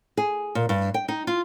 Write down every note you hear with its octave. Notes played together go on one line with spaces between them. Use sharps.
G#4
A#2
G2
G5
D#4
F4